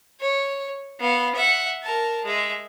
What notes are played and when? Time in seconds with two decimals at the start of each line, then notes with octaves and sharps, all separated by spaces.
0.20 C#5
1.00 B3 F5
1.35 E5 F#5
1.83 A#4 A5
2.24 G#3 E5